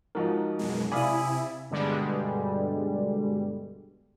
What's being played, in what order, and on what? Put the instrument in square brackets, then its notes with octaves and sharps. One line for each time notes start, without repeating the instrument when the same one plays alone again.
[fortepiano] G#2 F3 [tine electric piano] D#4 F#4 A#4
[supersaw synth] F#2 B2 G#3
[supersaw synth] C3 E4 [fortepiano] D5 F5 [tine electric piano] G#5 B5 D#6
[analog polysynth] G2 B2 D3 G3 G#3